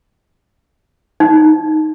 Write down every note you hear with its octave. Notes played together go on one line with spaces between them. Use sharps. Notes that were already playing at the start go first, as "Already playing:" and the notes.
D#4